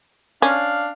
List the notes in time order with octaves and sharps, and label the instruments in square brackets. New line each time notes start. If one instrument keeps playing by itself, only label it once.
[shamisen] C#4 [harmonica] D4 F5